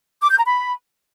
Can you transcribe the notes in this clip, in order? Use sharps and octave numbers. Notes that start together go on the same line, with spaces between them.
D6
G6
A#5
B5